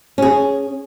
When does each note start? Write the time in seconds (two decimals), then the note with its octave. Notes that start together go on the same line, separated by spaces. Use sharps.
0.18 C#4 G#4